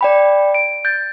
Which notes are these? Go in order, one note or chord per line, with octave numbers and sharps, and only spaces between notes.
D5 G5 B5
D7
G6 A6